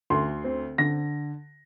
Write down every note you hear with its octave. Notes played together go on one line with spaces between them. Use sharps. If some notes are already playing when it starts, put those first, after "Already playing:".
D2 C6
C4
D3 A#6